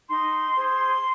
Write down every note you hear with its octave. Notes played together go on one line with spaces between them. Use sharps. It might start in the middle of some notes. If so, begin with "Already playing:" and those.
D#4 C6
G#4 C5